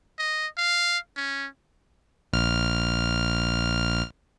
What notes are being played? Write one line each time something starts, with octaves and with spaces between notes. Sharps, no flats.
D#5
F5
C#4
A#1 F6